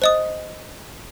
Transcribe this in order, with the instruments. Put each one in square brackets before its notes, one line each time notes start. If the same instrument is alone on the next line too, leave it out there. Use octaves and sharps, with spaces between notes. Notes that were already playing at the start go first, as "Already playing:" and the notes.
[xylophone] C5 D#5 D#6